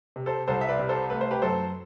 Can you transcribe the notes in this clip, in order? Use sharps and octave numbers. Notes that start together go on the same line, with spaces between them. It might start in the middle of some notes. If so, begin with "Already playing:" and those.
C3
A4 C5
C2 A4 C5
E5
B4 D5
C3
A4 C5
A3 B4
C5
G4 B4
F#2 A4 C5